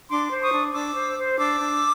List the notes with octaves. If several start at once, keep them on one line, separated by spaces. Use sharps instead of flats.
D4 C6 D6
C5
C#6 D#6
D4
D4 D6 E6
C5
C5
D4 D6 E6
D4